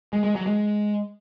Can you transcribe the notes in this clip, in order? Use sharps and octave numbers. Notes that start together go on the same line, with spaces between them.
G#3
G#3
F#3
G#3